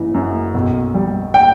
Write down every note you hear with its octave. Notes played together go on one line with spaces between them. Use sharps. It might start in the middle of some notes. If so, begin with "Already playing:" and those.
Already playing: F#1 C#3 E3
F#2
B1
G3
G5